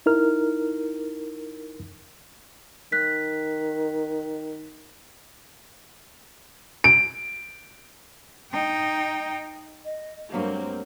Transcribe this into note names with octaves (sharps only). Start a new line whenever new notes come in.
D#4 E4 A#4 F6
D#3 F#6 B6
D7
D#4 G5
D#5
G2 F#3 A3 A#3 C4 F5